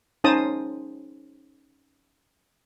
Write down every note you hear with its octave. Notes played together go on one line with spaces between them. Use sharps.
C#4 D#4 C5 A5 D#6